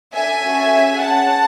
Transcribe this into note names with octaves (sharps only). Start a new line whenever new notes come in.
D4 A4 E5 G#5
C#4 F#4 A4
C#4 G#4
C#4 G#4 F#5 A5